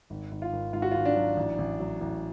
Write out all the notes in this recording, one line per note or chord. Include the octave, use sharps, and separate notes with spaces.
G#1
G#1
F4
G#1
G#2 F4
F#4
G#1 F4
D4
F#3
A1
A1
F#3
A1